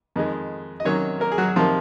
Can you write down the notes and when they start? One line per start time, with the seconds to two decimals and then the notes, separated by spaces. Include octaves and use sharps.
0.16 F2 D#3 G#3
0.80 D#5
0.85 C3 D#3 F#3 A#3 C#4 C#5
1.20 A#3 A#4
1.32 G#4
1.38 F#3 F#4
1.56 C3 D#3 F3 A#3 F4